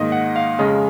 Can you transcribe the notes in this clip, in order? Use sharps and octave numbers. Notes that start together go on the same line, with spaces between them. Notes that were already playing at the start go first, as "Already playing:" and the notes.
Already playing: G#2 D#3 A#3 D#5
F#5
F5
F2 C#3 G#3 C#4 D#5